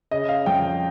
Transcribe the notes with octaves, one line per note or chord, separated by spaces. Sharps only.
C#3 D#5
F5
F2 G5